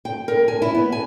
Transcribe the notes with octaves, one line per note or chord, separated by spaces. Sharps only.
G5
A#4
G#5
E4
B3
G#5